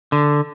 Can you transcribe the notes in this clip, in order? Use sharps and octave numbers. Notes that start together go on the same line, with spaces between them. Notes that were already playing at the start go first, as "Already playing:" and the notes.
D3